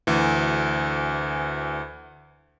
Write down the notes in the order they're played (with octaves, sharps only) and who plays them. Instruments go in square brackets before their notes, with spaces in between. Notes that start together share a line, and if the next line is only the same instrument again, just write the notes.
[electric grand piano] D2 E3